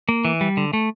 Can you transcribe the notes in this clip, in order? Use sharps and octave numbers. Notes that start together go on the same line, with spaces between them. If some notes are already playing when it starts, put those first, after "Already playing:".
A#3
E3
G3
D3
A3